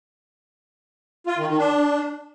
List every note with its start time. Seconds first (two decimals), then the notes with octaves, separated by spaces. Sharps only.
1.27 F4
1.37 D#3
1.47 D#3
1.58 D4